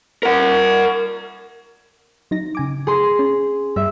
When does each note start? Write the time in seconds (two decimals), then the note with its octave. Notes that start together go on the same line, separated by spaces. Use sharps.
0.23 A#4 F#5
2.31 F#3 D#4 A#6
2.55 C#3 G#5 D6
2.87 G#4 C6
3.19 C#4
3.76 G2 G3 E5